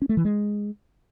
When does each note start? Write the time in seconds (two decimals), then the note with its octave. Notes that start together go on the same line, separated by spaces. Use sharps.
0.02 C#4
0.09 A3
0.17 E3
0.25 G#3